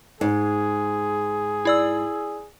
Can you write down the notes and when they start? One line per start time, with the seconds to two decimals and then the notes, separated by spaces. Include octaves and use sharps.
0.21 G#2 G#4
1.65 E4 D5 E6